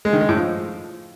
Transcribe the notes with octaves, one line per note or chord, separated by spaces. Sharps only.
G#3
D#3
G#3
A2
F3